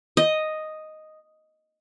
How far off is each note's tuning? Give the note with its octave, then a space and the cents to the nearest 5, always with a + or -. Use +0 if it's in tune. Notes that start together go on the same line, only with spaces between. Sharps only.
D#5 +0